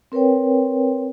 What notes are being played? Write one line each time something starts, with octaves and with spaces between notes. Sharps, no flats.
C4 A#4 B4 C#5 G5